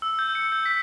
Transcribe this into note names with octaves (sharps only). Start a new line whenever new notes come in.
E6
G6
C#7
G6
B6